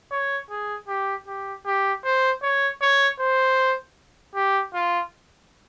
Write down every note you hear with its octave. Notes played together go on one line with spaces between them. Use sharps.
C#5
G#4
G4
G4
G4
C5
C#5
C#5
C5
G4
F4